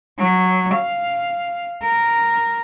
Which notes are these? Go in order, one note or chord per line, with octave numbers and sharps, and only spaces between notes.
F#3
F5
A#4